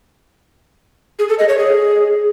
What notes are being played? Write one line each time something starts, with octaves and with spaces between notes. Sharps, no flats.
G#4
A4
D#5
C#5
G#4